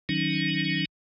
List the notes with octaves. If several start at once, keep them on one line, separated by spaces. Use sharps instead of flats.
D#3 F#3 C#4 D#4